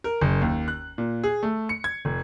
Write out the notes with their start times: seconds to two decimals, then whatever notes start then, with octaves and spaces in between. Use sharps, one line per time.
0.04 A#4
0.21 F#1
0.41 D#2
0.68 F#6
0.98 A#2
1.24 G#4
1.43 A3
1.69 C#7
1.84 G#6
2.05 F1